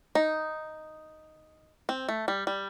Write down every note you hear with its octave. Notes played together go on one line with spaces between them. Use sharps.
D#4
C4
A3
G3
G3